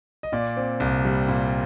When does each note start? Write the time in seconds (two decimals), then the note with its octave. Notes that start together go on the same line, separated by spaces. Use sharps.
0.23 D#5
0.32 A#2 D5
0.57 C4
0.80 C2
1.05 G3
1.28 A#2